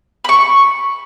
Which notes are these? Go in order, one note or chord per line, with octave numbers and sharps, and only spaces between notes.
B5 C#6